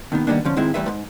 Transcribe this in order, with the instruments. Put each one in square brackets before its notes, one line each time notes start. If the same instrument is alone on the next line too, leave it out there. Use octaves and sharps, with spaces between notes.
[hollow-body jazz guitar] D#2 D#3 B3
D#3 G3 G#3 A#3 B3 D4
D3 F3 C#4
G#2 D#3 G#3 C4 E4
E2 A2 C#3 G3 B4 E5
G#2